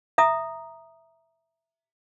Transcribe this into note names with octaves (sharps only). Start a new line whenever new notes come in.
E5 A#5 D#6